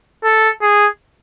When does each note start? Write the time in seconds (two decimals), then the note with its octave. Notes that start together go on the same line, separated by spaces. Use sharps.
0.24 A4
0.62 G#4